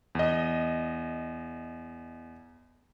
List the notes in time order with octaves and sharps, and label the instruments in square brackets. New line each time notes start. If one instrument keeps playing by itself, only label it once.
[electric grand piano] E2 D#5